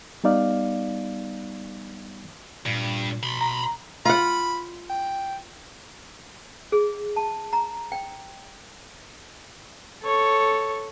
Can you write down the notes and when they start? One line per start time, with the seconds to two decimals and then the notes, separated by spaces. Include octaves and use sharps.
0.24 G3 B3 D#4 D5 F5
2.66 G2 A#2
3.23 B2 B5 C6
3.41 A#5
4.05 F4 F#5 B5
4.90 G5
6.72 G#4
7.16 A5
7.53 A#5
7.92 G5
10.03 A4 C#5